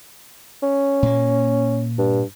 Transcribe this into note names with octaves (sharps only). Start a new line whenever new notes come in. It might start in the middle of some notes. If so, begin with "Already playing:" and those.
C#4
A#2 A#3
G2